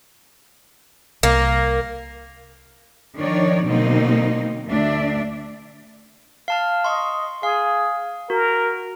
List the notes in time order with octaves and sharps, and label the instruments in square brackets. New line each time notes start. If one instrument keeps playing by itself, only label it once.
[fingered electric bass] C2 [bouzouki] A#3
[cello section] D#3 F3 D4 D#4 C#5 D5
B2 D3 F#3 A#3 C4 D#4
D2 D4 E5
[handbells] F5 A5 F6
[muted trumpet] D#5 [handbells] C6 C#6
[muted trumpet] G#4 [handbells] F5
[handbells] F#4 [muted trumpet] A#4